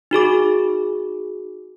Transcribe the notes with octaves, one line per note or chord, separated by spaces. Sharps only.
D#4 F#4 G#4 D6